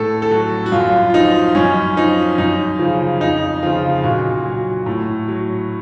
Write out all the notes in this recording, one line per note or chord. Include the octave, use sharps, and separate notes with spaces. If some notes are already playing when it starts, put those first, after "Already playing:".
Already playing: A2 A4
A4
F#3 F#4
F#4
F#2 F4
F4
F3 D#4
F#2 C#4
F3 D#4
F#2 D#4
C#3 F3
F2 D#4
C#3 F3 F4
A#2 F#4
F#3
A2
F#3